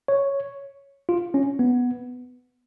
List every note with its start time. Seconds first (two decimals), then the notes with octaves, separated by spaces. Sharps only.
0.08 C#5
1.09 F4
1.34 C#4
1.59 B3